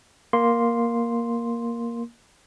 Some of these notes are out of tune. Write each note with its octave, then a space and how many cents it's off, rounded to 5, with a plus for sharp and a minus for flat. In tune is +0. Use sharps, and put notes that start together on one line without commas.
A#3 +5 C6 +0